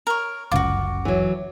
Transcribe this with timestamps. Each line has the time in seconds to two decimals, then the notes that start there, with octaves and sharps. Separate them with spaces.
0.07 A#4 C#5
0.52 G1 C#2 F#2 F4 F#4 D6
1.05 E3 F#3